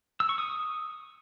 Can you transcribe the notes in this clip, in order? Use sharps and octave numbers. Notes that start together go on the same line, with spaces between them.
E6
C#6
D#6